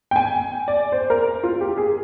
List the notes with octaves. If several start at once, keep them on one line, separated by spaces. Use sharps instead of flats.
G5
G#5
D5
C5
A#4
F4
G4
G#4